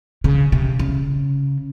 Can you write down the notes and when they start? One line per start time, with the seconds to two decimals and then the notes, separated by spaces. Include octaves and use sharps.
0.24 C#3
0.52 C3
0.79 C#3